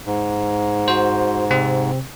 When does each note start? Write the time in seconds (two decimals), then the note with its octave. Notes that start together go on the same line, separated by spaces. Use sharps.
0.06 G#2
0.88 F#4 C5
1.51 C3 C4